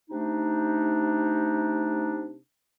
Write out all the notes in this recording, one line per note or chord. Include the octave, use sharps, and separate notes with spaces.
C3 A3 D4 D#4